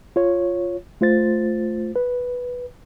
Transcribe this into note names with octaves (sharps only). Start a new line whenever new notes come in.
F4 C#5
A3 F4 C5 A6
B4